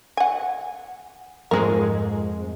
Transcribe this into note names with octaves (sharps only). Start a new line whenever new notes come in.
F#5 G#5
F2 G#2 G#3 G#4 A#4